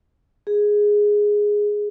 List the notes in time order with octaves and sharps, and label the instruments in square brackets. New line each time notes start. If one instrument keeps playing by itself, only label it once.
[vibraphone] G#4